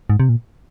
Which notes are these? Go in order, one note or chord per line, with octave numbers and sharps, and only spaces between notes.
G#2
C3
A#2